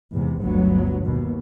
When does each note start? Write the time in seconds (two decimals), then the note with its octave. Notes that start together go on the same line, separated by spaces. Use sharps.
0.12 E2 G#2 C3
0.41 G1 D2 F#3 B3
1.05 D#2 B2